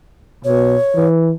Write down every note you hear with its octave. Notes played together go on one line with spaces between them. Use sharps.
B2 C#5
E3